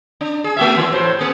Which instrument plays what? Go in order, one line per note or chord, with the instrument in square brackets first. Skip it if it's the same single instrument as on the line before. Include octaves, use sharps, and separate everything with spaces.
[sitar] D4
G#4
A3 F#4 E5
E2 E3
A2 C5
A#3 G#4